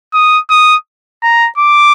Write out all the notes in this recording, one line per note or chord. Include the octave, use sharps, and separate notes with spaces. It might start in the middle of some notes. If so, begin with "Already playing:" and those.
D#6
D#6
A#5
D6